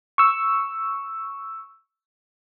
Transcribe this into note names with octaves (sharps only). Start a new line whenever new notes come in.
C#6 E6